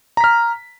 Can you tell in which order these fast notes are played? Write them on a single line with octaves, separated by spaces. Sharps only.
A#5 B6 F6